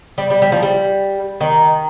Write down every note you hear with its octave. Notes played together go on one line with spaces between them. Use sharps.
G3
G3
G3
F3
G3
D#3